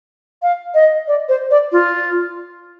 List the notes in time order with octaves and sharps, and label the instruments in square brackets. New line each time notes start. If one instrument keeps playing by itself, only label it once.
[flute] F5
D#5
D5
C5
D5
F4